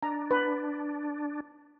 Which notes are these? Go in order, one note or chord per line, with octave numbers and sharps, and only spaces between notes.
D4 A#5
B4